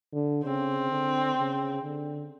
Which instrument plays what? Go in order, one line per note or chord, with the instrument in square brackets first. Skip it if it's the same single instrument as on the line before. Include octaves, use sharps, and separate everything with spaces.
[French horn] D3
[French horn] C#3 [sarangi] C4
[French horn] D3
C#3
D3